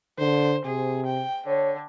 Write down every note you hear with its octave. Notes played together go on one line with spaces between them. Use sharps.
D3 C5
C3 G#4
G5
D3 C#5